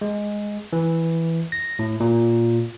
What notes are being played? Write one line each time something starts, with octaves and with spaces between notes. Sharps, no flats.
G#3
E3
A#6
A2
A#2